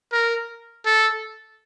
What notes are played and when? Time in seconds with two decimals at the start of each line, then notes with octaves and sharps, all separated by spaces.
0.13 A#4
0.86 A4